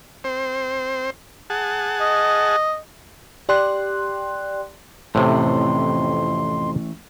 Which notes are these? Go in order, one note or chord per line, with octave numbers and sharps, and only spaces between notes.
C4 C5
G#4 F#5 A5
D#5
G4 D5 G5 C6 F#6
F2 A2 C3 E3 A3 C#4 C6